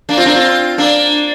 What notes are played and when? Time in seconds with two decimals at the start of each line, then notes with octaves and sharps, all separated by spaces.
0.09 A#3 D4
0.17 C4 F4
0.26 A#3 D4
0.35 C4 F4
0.78 A#3 D4